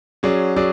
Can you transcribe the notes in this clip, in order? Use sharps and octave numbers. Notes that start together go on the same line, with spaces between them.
F#3 C#4 G#4 D5
F#3 C#4 G#4 D5